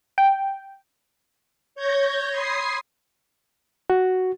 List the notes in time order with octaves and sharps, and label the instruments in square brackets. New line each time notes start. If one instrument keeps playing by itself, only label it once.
[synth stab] G5
[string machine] C#5 G6 G#6 A#6
B5 C6 D#6 G#6 C7
[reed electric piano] F#4